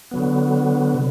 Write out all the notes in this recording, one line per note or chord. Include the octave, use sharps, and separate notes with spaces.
D3 F#3 B3
C3